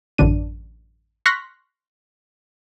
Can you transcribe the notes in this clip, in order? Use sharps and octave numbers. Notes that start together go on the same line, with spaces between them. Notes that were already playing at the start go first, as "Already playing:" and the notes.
A1 F#2 D3 D4 D#7
C6 C#6 F6 F#6 A#6 B6